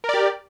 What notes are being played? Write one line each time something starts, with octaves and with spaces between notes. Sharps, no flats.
G4 A#4 D5